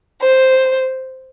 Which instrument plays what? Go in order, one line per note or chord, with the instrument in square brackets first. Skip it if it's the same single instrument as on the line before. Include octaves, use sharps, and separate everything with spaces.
[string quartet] C5